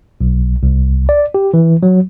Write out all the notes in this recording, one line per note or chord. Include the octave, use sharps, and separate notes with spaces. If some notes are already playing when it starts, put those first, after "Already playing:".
B1
C2
D5
G4
E3
F#3